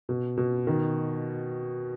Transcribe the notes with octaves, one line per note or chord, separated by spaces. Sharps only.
B2
B2
D#3